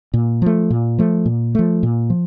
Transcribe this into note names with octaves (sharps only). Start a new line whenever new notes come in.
A#2
F3 A3
A#2
F3 A3
A#2
F3 A3
A#2
F3